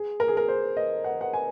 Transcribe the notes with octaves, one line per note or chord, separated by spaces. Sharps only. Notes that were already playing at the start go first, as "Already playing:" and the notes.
Already playing: G#4
A#4
G#4
A#4
C5
D#5
F#5
F#5
G#5